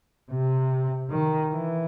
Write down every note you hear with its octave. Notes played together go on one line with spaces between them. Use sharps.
C3
D#3
E3